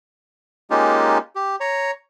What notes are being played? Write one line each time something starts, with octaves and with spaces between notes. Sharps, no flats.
G#3 A#3 C#4 D#4 F4 G4
G4
C#5 A#5